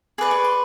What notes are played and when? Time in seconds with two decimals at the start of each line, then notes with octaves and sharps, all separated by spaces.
0.18 G#4 B4 D5 D6
0.31 C#6
0.44 C6